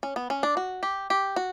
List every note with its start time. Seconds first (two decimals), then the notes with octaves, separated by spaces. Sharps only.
0.03 C#4
0.16 B3
0.30 C#4
0.43 D4
0.57 F#4
0.83 G4
1.10 G4
1.36 F#4